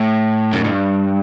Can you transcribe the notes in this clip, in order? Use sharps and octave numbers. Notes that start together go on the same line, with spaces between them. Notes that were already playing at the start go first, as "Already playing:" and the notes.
Already playing: A2
F#2
G2